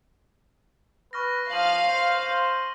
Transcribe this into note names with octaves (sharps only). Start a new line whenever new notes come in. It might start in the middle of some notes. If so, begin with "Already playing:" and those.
B4 C#6 F6 A#6
F3 F5 F6 D#7 F#7
C5
F6